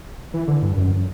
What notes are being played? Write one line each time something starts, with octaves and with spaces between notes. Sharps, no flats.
E3
D3
G2
F#2